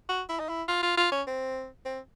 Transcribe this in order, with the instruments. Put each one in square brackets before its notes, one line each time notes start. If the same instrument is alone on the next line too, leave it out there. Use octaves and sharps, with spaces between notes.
[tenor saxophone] F#4
E4
D#4
E4
F4
F4
F4
C#4
C4
C4